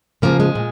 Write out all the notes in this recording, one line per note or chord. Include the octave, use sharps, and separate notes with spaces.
C#3 F3 A#3
G#3
A#2